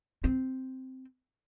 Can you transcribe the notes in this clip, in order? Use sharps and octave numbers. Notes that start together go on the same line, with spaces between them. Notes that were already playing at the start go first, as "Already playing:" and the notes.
C4